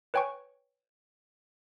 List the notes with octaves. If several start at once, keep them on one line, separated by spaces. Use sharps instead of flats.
B4 C#5 G5 G#5 C#6